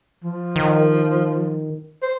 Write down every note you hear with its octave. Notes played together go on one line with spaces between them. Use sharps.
F3
D#3
C5